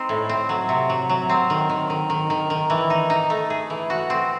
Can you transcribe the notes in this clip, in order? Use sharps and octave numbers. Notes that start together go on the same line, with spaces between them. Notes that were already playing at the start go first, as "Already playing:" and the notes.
Already playing: C4 D#4
A2
C4
F#3
C3
F#3
F#3
C4
D#3
D#3
D#3
D#3
D#3
D#3
E3
D#4
D#4
A3
G#4
E3
F#4
C4